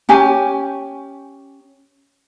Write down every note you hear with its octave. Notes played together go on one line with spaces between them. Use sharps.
C#4 G4 G#5